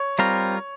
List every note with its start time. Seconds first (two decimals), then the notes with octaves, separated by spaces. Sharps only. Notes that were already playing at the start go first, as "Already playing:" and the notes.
Already playing: C#5
0.19 G3 C4 F4 A#4